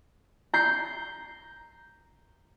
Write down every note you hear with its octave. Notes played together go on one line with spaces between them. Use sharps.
A#5 G6 C7